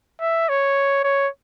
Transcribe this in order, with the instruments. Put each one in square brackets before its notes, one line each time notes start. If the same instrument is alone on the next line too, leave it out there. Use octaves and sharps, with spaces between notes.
[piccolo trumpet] E5
C#5
C#5